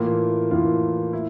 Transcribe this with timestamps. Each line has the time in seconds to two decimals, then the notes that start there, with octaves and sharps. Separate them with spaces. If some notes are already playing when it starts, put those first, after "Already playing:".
Already playing: A2 E3 A#3 F4
0.51 A2 E3 A#3 F4
1.13 E4